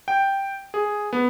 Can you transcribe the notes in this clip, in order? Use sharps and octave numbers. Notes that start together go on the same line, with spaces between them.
G5
G#4
B3